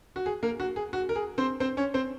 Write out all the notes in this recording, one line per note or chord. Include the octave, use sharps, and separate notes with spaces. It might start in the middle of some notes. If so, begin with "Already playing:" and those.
F#4
G#4
A#3 A#4
F#4
G#4
F#4
A#4
G#4
C4 C5
C4 C5
C#4 C#5
C4 C5